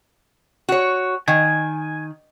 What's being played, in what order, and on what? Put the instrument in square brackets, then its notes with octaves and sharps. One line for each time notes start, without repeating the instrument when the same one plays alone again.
[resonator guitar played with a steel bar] F#4 C#5
[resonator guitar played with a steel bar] D#3 [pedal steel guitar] G#5